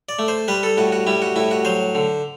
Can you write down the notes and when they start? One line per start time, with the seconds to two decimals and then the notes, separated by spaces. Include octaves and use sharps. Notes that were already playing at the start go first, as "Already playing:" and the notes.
0.09 D5
0.19 A3
0.28 C5
0.48 G3 B4
0.63 A4
0.78 A2 F#4
0.92 F#4
1.07 G3 E4
1.22 F#4
1.36 A2 E4
1.51 F#4
1.65 F#3 C5
1.95 D3